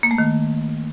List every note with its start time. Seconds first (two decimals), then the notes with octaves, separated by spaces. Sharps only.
0.03 A#3
0.11 A3
0.18 D#3